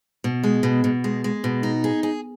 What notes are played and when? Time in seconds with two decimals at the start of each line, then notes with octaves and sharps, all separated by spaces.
0.24 B2
0.43 G#3
0.63 B2
0.84 B2
1.04 G#3
1.24 G#3
1.44 B2
1.63 D#4
1.84 G#4
2.03 G#4